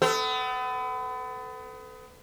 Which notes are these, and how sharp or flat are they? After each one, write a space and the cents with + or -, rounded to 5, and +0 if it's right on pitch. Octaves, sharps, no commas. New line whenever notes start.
B3 +35 A4 +0